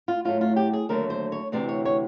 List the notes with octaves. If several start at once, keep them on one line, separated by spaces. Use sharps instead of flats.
F4
A2 F#3 A3 F4
F4
G4
G#4
D#2 D3 F#3 A3 A#4
C5
C#5
D2 C3 E3 D5
C#5
C#5